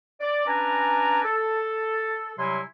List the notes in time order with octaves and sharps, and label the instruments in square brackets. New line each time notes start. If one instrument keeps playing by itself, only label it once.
[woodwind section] D5
C#4 D4 B4 D5 G#5 A#5
A4
C3 F#3 G3 E4 G#5 C6